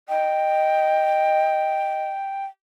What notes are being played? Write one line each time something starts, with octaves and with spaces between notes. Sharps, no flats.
D#5 G5